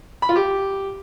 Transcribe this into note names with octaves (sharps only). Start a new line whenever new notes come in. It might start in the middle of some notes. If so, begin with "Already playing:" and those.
B5
F4
G4